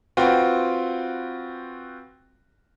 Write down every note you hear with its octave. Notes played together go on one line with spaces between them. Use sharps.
C4 F4 F#4 B4 G5